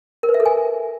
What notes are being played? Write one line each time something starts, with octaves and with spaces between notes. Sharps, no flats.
A#4
B4
E5
A4
G#5